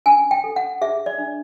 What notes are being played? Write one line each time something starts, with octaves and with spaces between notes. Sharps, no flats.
C#4 G#5
G5
A4
F#5
G#4 E5
D5
D4